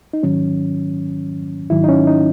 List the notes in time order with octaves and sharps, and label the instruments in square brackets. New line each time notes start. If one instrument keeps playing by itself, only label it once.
[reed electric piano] D#4
G#2 D#3 F#3 C#4
G#2 D#3 F#3 E4
D#4
C#4
D#4